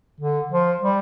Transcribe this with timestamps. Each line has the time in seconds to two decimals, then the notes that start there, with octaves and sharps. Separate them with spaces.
0.21 D3
0.51 F3
0.81 G3